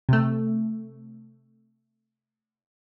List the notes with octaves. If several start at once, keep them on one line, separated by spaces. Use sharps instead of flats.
C3 A3